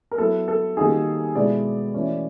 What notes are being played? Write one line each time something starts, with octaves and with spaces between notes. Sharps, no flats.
A#4
F#3 B3 E4 A4
A4
D#3 G3 A#3 D#4 F#4 G#4
B2 G#3 B3 E4 G#4 D5
E3 A3 C#4 F#4